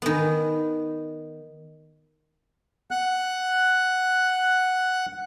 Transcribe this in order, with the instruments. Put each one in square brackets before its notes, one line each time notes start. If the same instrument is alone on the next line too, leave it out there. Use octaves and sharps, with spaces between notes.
[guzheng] D#3 B3
[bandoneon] F#5 F#6